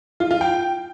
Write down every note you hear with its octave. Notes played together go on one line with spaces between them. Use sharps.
F4
F4
G5